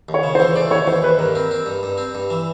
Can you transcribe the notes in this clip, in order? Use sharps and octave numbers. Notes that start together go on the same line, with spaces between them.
D#2
C#5
C#3
C5
E3
A3 D5
D#2 C#5
E3 C5
D#2 B4
G2 A#4
C4
C4
G2
G2
C4
G2
E3